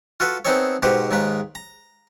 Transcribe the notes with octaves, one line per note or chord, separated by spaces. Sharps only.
F4 F#4 A4 B4
B3 C4 D#4 G#4 A4 C#5
G#2 B2 F#4 G4 C5
D#2 G#2 D#3 G#3 B4
A#5